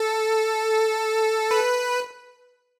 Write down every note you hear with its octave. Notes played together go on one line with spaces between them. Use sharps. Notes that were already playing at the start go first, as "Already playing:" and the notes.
Already playing: A4
B4